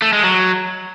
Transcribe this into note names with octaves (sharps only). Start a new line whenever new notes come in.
A3
G#3
F#3